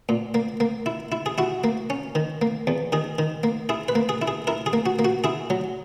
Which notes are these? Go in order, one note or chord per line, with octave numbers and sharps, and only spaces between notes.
A#2
A#3
A#3
E4
E4
G#4
E4 F#4
A#3
C#4
D#3
A#3
E2
D#3 G#4
D#3
A#3
E4 G#4
B4
A#3
G#4
E4
G#4
E4 A#4
G#4
A#3
F#4
A#3
F#4
E4 G#4
F#3